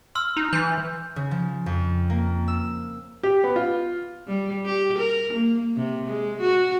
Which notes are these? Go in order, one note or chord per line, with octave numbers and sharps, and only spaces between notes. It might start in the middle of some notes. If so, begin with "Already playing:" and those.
C6 E6 F6
D#4
E3 C6 G6
C#3
F3
F2
A#3
E6
G4
B3
F4
G3
G4
A#4
A#3
C3
G#3
F#4